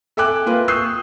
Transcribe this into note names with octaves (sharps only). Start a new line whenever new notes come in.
A4 E5 G5 G#5 D6 F#6
A#3 F4 B4 G5
C#6 D#6 E6 F#6 G6 C7